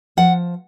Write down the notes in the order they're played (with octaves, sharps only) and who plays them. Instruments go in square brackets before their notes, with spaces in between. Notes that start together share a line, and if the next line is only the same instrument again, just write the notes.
[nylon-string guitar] F3 F#5